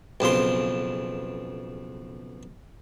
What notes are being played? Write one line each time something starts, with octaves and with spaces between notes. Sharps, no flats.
B1 F2 C#3 C6